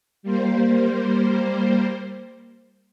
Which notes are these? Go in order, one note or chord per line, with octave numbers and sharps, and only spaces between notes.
G3 A#3 C5